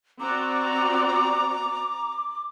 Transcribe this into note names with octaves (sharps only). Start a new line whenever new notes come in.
C4 F#4 D5 A#5 D6